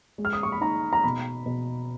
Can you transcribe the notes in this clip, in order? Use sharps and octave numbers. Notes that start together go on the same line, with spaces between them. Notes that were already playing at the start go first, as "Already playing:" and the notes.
G#3
F6
D#6
C#6
B5
D#4 A#5
A#5
B2 B5
B2